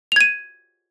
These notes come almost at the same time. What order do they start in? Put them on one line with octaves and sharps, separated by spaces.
F7 G#6 D#7